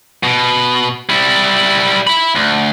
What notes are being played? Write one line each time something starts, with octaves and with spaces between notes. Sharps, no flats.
B2
G3 E4
E5 B5
D2